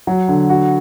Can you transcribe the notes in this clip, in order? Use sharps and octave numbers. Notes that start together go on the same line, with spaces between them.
F#3
D3
F#4